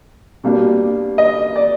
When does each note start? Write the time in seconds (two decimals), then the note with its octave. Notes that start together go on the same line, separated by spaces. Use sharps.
0.44 B2 G3 A#3 D4
1.18 D#5
1.56 D5